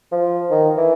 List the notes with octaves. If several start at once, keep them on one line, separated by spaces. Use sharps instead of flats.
F3
D#3
E3